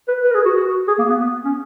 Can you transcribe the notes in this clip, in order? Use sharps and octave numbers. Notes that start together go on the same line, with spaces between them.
B4
B4
A#4
G#4
F#4
F#4
G#4
A#3
B3
B3
C#4